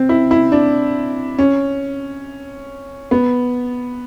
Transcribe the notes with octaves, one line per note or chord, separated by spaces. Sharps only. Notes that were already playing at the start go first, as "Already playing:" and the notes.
Already playing: C4
E4
E4
D4
C#4
B3